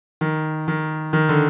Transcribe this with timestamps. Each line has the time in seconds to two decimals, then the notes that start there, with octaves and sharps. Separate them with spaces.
0.21 D#3
0.68 D#3
1.13 D#3
1.29 D3